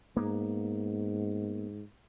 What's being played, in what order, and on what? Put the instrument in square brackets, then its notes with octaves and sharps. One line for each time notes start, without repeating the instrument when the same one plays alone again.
[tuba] G#2 [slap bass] A#3 B3